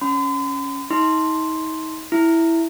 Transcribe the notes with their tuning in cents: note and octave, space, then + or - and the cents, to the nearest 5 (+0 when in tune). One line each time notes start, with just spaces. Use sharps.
C#4 +0 C6 -45
D#4 +35 C6 +0
E4 +0 E5 +0